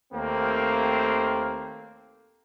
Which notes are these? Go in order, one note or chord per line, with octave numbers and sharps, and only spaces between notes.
D#2 A3 A#3 C4